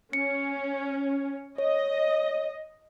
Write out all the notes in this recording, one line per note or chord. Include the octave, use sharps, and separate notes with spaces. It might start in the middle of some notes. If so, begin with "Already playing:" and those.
C#4 C#7
C#5 D#5